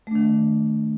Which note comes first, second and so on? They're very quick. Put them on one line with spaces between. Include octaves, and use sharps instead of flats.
A3 D4 D#3